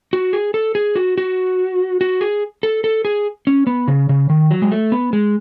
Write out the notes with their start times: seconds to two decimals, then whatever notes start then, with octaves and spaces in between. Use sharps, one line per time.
0.13 F#4
0.33 G#4
0.54 A4
0.75 G#4
0.96 F#4
1.18 F#4
2.01 F#4
2.21 G#4
2.63 A4
2.84 A4
3.05 G#4
3.47 C#4
3.67 B3
3.88 C#3
4.09 C#3
4.30 D#3
4.51 F#3
4.62 G#3
4.71 A3
4.92 B3
5.13 G#3